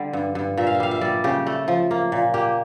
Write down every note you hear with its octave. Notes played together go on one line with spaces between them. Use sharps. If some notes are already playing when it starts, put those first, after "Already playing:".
Already playing: D3 G3
G2
G2
A#2 E5
F5
E5
G3 F5
E5
G3 D5
C#3 G4
A3
F3
A#3
A#2
A#3 G4